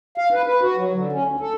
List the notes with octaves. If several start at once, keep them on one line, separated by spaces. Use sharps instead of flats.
F5
B4
B4
F#4
F#3
D3
C#4
D2
A4